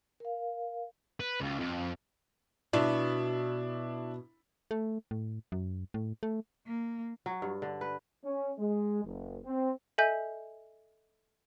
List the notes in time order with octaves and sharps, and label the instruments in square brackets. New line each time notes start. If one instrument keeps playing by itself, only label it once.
[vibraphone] A#4 F5
[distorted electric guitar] B4
C#2
F2
[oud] B2 [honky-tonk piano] D4 E4
[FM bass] A3
A2
F#2
A2
A3
[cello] A#3
[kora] F#3
G2
D3
B4
[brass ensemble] C#4
G#3
F#1
C4
[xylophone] A4 D#5 E5 G#5 G6